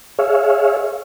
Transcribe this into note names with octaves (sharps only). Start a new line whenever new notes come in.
G#4 C#5 E5 F5